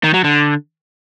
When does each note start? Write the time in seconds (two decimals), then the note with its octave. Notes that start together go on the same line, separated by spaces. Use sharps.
0.03 D#3
0.14 F#3
0.24 D3